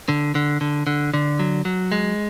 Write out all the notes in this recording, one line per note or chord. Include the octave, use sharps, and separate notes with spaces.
D3
D3
D3
D3
D3
F#3
F#3
G#3